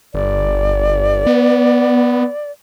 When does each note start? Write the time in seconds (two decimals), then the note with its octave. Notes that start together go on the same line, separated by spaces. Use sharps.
0.14 G1 D5
1.27 B3